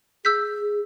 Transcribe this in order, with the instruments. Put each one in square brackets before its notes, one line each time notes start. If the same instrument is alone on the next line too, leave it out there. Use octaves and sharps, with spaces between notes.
[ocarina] G#4 [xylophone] E6 G6 B6